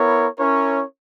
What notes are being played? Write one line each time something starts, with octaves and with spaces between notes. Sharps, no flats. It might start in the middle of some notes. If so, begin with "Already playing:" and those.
Already playing: B3 E4 A#4 C#5
C#4 E4 A#4 C#5